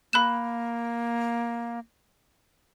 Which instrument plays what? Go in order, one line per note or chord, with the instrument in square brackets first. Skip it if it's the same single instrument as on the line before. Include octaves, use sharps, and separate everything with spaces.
[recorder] A#3 [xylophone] B5 F#6 E7